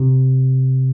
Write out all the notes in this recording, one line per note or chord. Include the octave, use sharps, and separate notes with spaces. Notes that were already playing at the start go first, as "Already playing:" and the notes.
Already playing: C3